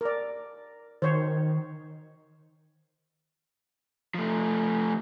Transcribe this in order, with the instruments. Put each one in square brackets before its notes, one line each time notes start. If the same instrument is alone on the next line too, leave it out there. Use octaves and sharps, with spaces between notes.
[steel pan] A#4 D5
[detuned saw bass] D#3 [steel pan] C5 C#5
[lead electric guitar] F3 A3